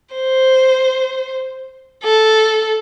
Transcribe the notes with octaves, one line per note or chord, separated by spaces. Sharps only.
C5
A4